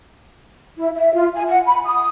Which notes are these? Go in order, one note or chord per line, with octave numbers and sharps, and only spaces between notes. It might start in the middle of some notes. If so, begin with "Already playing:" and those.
E4
E5
F4
G#5
F#5
B5
D#6